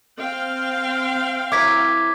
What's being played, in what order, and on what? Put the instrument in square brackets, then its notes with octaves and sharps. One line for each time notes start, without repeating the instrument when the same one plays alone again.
[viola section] C4 F5 G5
[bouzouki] E4 A#4 C#5 [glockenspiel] D6 G#6 B6